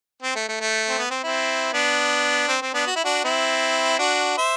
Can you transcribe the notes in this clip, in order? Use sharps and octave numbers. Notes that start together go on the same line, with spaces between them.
C4
A3
A3
A3
C4
B3
C4
C4 E4
B3 D4
C4
C4
B3 D4
F#4
E4
D4 F#4
C4 E4
D4 F#4
C5 E5